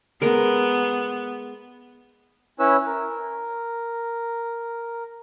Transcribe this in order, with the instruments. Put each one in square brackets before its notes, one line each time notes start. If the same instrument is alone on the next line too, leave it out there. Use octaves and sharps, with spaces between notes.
[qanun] G#3 A#4 [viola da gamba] B3
[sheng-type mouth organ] C#4 E4 B4 C#5 E6
A#4